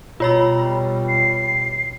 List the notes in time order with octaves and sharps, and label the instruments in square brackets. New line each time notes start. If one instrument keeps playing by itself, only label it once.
[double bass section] B2 G3 [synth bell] F4 C#5 B5 [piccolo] A#5
[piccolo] C7